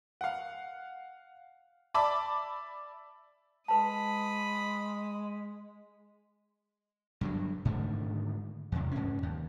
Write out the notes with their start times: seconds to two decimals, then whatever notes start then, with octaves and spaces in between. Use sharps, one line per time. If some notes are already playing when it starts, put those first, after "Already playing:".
0.21 F5 F#5
1.94 D5 E5 A5 B5 D6
3.68 G#3 B4 A5 B5 D#6
7.21 G2 D3 F#3
7.65 G#2 D3 D#3 A3
8.72 E2 C3
8.91 G#2 C#4
9.23 D#2